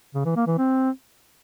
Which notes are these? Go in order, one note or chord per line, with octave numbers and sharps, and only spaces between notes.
C#3
E3
A#3
E3
C4